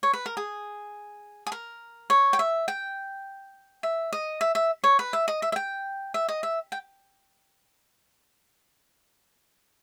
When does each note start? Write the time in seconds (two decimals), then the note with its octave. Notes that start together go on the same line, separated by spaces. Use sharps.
0.03 C#5
0.13 B4
0.26 A#4
0.37 G#4
1.47 G#4
1.52 A#4
2.10 C#5
2.33 G5
2.39 E5
2.68 G5
3.83 E5
4.13 D#5
4.41 E5
4.55 E5
4.84 C#5
4.99 B4
5.13 E5
5.28 D#5
5.42 E5
5.52 E5
5.56 G5
6.14 E5
6.29 D#5
6.43 E5
6.72 G5